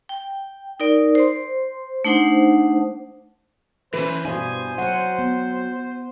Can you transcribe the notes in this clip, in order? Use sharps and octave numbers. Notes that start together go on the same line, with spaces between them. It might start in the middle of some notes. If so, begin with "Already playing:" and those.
G5
D#4 A#4 D5
C5 C6
A3 D4 D#4 C5 F#5
E3 C#4 B4 C5
G2 B2 E4 G#5
F#3 C4 F#5
B3